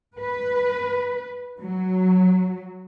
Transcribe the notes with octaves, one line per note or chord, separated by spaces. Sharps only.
B4
F#3